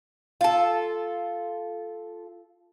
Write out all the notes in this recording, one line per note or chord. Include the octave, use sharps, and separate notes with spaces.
F4 A4